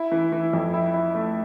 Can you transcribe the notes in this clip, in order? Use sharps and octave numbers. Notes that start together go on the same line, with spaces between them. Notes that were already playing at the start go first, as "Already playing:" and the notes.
Already playing: E4
E3
E3
F2
E4
E4
A3